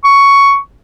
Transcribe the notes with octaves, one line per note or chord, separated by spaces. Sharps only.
C#6